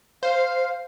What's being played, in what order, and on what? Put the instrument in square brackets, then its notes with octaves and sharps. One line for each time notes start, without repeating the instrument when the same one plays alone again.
[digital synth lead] C5 [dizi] F5